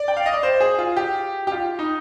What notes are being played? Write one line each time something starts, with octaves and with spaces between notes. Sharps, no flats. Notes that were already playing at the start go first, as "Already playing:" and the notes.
Already playing: D5
G5
F5
D#5
D5
C5
G#4
F4
G4
G4
F4
D#4